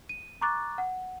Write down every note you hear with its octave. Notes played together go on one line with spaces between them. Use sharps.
D#7
A#5 C#6 D6 F#6 A6
F#5